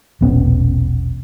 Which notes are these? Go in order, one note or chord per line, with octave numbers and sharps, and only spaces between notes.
E1 A#1 B3 C#4